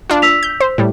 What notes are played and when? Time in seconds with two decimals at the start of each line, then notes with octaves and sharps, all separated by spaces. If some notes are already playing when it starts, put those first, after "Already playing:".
0.10 D4 F4
0.22 E6 B6 F7
0.43 G6
0.60 C5
0.78 A2 G3